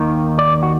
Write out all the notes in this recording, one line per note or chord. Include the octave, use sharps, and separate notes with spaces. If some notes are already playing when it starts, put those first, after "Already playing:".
Already playing: D#2 D#3 A#4
D5
F#4